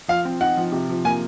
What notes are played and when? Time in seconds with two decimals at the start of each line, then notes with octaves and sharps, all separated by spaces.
0.08 F3 F5
0.25 C4
0.41 D#4 F#5
0.57 F3
0.72 C3
0.89 F3
1.05 A#3 G#5